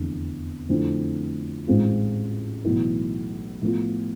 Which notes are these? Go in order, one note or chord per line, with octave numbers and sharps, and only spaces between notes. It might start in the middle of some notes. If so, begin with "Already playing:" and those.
Already playing: F1 E2 D3
F2 D3 A3 C4 E4
A1 G#2 G#3 C4 F4
B1 A2 E3
A2 F3 B3 F4